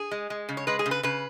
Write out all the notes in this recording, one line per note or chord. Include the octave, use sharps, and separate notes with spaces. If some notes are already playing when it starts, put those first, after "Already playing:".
Already playing: G#4
G#3
G#3
C#3
C#5
G#3 B4
G#4
C#3
B4
C#3 B4